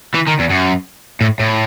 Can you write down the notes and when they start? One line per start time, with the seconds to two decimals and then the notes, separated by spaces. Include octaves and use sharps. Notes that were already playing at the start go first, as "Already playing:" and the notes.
0.14 E3
0.27 D#3
0.39 E2
0.50 F#2
1.21 A2
1.40 A2